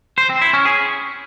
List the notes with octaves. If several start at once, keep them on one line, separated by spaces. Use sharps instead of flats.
C5
C4
E4
C#4
G#4